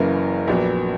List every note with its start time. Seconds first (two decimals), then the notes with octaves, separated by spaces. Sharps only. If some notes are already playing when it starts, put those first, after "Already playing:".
Already playing: F#1 F#2 E3 A#3
0.47 A#1 A#2 F#3 B3